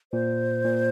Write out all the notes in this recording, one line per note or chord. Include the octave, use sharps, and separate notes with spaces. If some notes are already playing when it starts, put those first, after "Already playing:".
A#2 C5
A#2